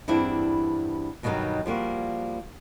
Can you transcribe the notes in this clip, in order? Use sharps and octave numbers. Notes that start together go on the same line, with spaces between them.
E2 G2 C4 D4 E4
G2 B2 D#3 F3 F#3 D#4
F3 G3 A#3 F#4